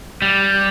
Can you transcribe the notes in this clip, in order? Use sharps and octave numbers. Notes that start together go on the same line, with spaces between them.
G3